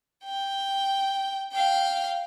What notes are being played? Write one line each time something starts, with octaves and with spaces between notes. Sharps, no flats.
G5
F5 G5